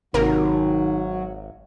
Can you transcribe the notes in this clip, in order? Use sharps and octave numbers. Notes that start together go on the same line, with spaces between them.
G#1 C3 D#3 F#3 A#3 A#4